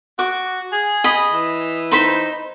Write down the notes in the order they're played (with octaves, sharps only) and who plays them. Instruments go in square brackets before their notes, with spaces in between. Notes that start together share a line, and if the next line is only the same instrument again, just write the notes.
[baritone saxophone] F#4 [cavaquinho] D6
[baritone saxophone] G#4
[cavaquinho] D#5 B5
[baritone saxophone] E3
[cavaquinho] D#4 C5 B5